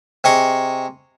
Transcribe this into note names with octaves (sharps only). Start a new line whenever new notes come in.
C3 G#4 D#5 C#6 D#6